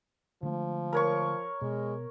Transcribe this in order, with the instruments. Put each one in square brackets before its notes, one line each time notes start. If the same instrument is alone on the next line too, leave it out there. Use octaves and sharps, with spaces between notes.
[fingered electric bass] D3 G#3 A3 [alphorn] F3
[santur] A#4 C#5 C#6
[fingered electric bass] B2 [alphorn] G#3